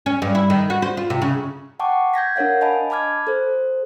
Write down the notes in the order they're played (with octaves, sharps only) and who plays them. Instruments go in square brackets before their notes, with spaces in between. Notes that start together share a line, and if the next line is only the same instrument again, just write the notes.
[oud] C#4
G2
E4
D#3
F#4
C5
F4
C3
C#3
[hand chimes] F#5 G5 A5 C#6 D6
G6 G#6 A#6 B6
D4 A#4 C#5 F5 F#5
D#5 G#5 A5 B5
A5 B5 D6 F6 G#6
A4 C5